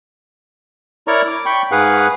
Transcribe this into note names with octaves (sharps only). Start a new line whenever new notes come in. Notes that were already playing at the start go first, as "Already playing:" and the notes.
E4 A#4 C#5 D5 A#5 C#6
D6
G5 B5 C#6
G#2 G#4 B4 F5 F#5